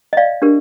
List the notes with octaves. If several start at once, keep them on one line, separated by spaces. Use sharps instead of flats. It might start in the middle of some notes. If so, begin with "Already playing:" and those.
D#5
D5 F5
D4 G4 A#4